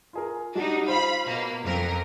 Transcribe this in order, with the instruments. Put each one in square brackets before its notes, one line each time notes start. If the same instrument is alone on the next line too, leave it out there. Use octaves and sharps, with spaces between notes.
[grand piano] F4 G#4 A#4
[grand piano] G3 F#4 G4 [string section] D4 D#4
[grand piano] F4 C5 [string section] F5 B5
[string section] B2 A#3
F2 A#4